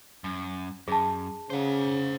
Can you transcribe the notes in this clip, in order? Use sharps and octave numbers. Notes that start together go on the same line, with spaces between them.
F#2
F#2 G#4 A5
C#3 C5 F#5